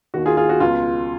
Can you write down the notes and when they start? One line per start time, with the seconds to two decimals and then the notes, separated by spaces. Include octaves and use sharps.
0.14 D#2 D#3 F#4
0.26 F4 G#4
0.37 F4 G#4
0.49 F#4
0.60 C#2 B2 F4